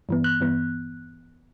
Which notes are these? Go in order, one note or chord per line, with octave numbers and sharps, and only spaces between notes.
G2 E3 B3
F#6
G2 E3 B3